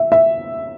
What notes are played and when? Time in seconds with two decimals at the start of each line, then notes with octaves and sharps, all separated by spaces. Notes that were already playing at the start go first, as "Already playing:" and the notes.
Already playing: E5
0.12 E5